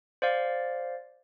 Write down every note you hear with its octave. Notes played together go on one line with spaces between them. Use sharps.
C5 D5 F5